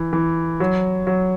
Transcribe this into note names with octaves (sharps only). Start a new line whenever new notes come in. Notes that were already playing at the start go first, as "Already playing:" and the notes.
Already playing: E3
E3
F#3
F#3